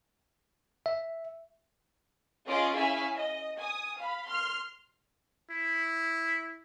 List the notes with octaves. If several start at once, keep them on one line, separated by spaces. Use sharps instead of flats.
E5
C#4 F4 G#4 D#5 C6 D6
C#4 E4 G#4 E5 F5 G#5
D#5
G#5 D#6
F5 B5
C6 F6
E4